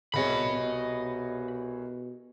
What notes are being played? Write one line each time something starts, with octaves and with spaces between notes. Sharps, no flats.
C2 B2 G#4 C#5 D#5 B5